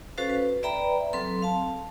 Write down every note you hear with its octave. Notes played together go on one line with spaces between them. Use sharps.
C#4 F#4 A4 B4 C5 F5
B4
B4 D5 E5 G5 A#5 B5
F#3 C4 A4 C6
F5 A5